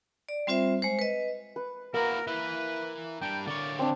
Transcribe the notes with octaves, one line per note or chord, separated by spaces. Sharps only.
D5
G3 C4 F4 C5 E5
G#3 C5
B4 D#5
B4
A#3 E4 F#4 A#4
E3 B4 E5
G3 D4 G5
D3 C#5 D5
C4 D4